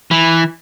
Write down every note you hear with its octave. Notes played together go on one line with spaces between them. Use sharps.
E3